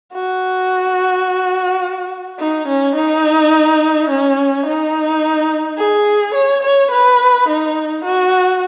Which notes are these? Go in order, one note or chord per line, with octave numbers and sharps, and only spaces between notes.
F#4
D#4
C#4
D#4
C#4
D#4
G#4
C#5
C#5
B4
D#4
F#4